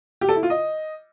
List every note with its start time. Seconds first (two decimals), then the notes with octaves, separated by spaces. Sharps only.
0.21 G4
0.29 A4
0.36 E4
0.43 F4
0.50 D#5